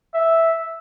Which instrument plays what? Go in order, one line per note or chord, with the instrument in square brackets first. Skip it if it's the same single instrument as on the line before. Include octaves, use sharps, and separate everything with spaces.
[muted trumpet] E5